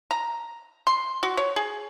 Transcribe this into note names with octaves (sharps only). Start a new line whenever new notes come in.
A#5
C6
F#4
C#5
G#4